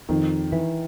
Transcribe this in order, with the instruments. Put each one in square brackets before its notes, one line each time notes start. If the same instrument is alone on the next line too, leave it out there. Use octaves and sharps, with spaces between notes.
[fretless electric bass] F2 [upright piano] D#3
[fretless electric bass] E3